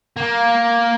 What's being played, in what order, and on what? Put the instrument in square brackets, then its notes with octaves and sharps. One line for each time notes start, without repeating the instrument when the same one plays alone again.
[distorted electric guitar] A#3